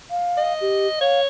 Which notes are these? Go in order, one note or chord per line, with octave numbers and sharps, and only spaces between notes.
F5
D#5
G4
C#5 F5